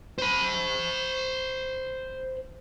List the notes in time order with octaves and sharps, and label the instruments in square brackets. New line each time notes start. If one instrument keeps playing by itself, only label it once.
[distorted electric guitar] C5 B5